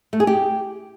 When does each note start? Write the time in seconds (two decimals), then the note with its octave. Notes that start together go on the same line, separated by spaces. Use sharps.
0.13 A3
0.20 G#4
0.27 G4